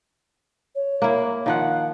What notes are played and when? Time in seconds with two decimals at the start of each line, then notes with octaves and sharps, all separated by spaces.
0.75 C#5
1.02 A#3 E4
1.46 D#3 F3 F5 F#5